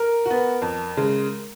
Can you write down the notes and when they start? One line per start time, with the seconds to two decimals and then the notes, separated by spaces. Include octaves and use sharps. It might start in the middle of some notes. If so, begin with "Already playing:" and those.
Already playing: A#4
0.25 F#4
0.30 B3
0.62 F2
0.97 C#3 G#3